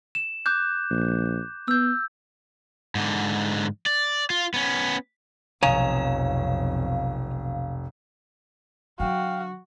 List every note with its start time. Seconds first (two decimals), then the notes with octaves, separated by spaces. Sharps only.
0.15 E7
0.46 D6 F#6 G6
0.91 A#1
1.68 B3 E6 G6
2.95 G#2 D3
3.86 D5
4.30 F4
4.54 B3 C#4
5.63 F1 B1 F2 C#5 F5 G#5 A#5
9.00 D3 F#3 F#4 F5 G5